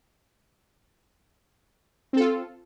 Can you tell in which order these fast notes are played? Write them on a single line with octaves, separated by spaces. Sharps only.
C4 A4 F4